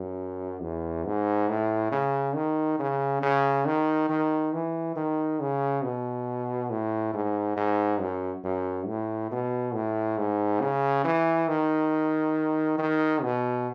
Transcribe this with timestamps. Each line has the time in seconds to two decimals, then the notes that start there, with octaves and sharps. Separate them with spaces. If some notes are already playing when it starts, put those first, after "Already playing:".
Already playing: F#2
0.62 E2
1.05 G#2
1.49 A2
1.92 C#3
2.35 D#3
2.79 C#3
3.22 C#3
3.66 D#3
4.09 D#3
4.53 E3
4.96 D#3
5.40 C#3
5.83 B2
6.70 A2
7.13 G#2
7.56 G#2
8.00 F#2
8.44 F#2
8.87 A2
9.31 B2
9.74 A2
10.18 G#2
10.61 C#3
11.04 E3
11.48 D#3
12.78 D#3
13.22 B2